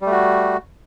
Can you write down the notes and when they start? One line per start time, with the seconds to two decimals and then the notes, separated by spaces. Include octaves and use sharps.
0.02 G3
0.07 A3
0.11 F#4